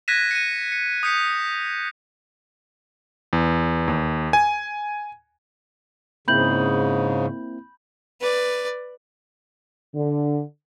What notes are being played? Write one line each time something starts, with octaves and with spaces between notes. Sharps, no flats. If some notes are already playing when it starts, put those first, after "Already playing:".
F#6 G#6 A#6 B6 D#7 E7
C#7 D#7
C#7
D#6 G6 B6 C#7 D#7
E2
D#2
G#5
G#2 C#3 A#3 C4 E4 B5 G6 F#7
B4 D5
D3